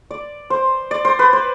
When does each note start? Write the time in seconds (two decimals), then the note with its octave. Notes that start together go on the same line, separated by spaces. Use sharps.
0.11 D5
0.50 C5
0.91 D5
1.05 C5
1.19 B4
1.33 C5